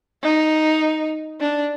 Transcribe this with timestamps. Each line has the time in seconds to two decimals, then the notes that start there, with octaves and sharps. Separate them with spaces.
0.22 D#4
1.40 D4